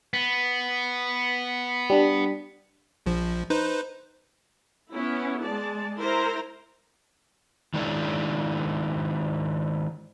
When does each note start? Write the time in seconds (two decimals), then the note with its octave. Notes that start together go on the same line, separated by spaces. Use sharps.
0.13 B3
1.90 G3 D4
3.06 A#1 F3
3.50 D#4 B4 C5
4.92 B3 C#4 E4
5.41 G#3 D5 A5
5.99 E4 A#4 C5 A#5
7.74 D#3 G#3 D4 E4